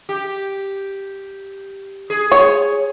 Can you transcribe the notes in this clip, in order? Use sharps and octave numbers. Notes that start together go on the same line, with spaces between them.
G4
G#4
C#5